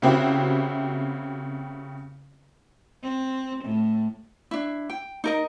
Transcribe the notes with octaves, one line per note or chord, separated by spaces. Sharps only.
C#3 A#3 C4 E4 F#4 G4
C4
A2
D4 E4
G5
D#4 A#4 D#5